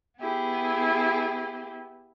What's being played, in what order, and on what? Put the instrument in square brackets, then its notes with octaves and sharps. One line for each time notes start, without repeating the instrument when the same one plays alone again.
[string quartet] B3 E4 G4 G#4